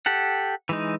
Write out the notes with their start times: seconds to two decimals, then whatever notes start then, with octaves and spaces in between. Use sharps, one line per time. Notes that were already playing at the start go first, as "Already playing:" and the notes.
0.06 G4 A4 F#5
0.69 E3 G#3 D#4